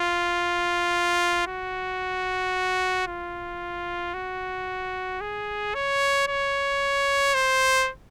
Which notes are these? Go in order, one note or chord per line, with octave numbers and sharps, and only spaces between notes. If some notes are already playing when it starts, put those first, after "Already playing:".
Already playing: F4
F#4
F4
F#4
G#4
C#5
C#5
C5